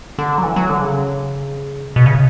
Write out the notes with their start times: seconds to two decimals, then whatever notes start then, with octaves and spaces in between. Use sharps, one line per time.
0.19 D3
0.38 F#3
0.44 E3
0.56 F#3
0.70 D3
0.82 C#3
1.96 B2
2.06 C#3